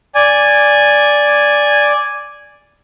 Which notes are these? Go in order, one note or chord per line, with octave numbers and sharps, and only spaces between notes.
D5 G#5